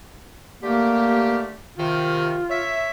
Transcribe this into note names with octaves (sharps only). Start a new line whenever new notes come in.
D3 A3 A#3 G4
C3 D#3 F4
C#5 E5